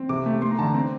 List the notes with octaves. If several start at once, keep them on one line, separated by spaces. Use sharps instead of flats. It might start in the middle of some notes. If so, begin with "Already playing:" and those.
Already playing: C4
C3 D6
A3
A3 C6
A#5
D3 A5
A#5
C4